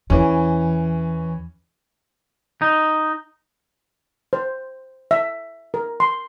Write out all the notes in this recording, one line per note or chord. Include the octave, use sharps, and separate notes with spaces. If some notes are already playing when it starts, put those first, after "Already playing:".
E2 E3 C#4
D#4
C5
E5
A#4
C6